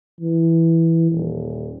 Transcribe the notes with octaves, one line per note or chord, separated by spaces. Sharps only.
E3
D#1